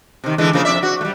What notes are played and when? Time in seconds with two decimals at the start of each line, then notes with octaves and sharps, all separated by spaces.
0.24 C3 D#3
0.38 D3 E3 G#3
0.53 C#3 F3 A#3
0.65 F2 D5 E5
0.83 F#4
1.01 G3 A3